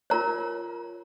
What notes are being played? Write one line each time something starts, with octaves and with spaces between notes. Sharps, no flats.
F4 A#4 C#5 A#5